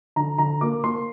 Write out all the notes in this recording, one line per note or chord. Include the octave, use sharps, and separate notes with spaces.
D3 A#5
D3 A#5
A#3 D6
A#3 C6